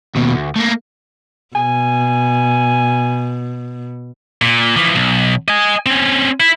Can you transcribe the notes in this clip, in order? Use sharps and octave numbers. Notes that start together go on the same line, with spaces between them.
D#2 B2
D2
A3 A#3
B2 G#5
A#2
E3 F3
B1
D#5 G#5
C4 C#4
E4